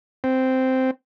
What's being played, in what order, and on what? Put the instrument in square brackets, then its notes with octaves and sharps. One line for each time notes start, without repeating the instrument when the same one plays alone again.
[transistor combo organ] C4